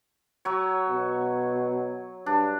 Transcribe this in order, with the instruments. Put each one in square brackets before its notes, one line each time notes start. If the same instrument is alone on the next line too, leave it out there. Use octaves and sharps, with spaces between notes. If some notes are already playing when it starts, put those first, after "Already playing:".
[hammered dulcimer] F#3 C#5
[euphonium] B2
[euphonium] G2 [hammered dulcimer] D4